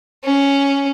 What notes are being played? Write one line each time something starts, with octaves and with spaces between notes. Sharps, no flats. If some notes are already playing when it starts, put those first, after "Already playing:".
C#4